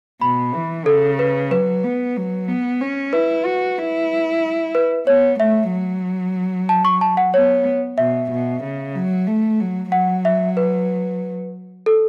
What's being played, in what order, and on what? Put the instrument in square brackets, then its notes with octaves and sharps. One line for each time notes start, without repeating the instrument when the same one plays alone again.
[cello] B2 [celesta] B5
[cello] E3
[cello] C#3 [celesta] A4
[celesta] B4
[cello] F#3 [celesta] B4
[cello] B3
F#3
B3
C#4
[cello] E4 [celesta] B4
[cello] F#4
E4
[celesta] B4
[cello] B3 [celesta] C#5
[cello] A3 [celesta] E5
[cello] F#3
[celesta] A5
C#6
A5
F#5
[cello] B3 [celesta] C#5
[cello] B2 [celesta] E5
[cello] B2
C#3
F#3
A3
F#3
[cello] F#3 [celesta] F#5
[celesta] E5
B4
A4